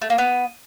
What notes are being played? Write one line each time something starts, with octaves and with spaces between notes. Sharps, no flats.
A3
A#3
B3